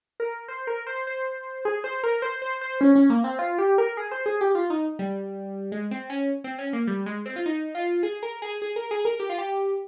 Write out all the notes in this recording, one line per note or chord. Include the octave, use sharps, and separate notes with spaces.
A#4
C5
A#4
C5
C5
G#4
C5
A#4
C5
C5
C5
C#4
C#4
A#3
C4
F4
G4
A#4
G#4
C5
G#4
G4
F4
D#4
G3
G#3
C4
C#4
C4
C#4
A#3
G3
G#3
C4
F4
D#4
F4
G#4
A#4
G#4
G#4
A#4
G#4
A#4
G4
F4
G4